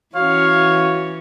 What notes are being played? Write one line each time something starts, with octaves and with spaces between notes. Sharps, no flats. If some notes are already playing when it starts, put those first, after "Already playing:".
E3 C#4 F#4 C#5 F5